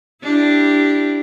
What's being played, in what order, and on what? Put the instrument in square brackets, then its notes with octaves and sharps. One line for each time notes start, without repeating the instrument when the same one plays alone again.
[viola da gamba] D4 E4 G4